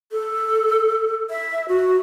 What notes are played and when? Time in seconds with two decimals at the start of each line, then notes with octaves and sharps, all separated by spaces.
0.12 A4
1.30 E5
1.69 F#4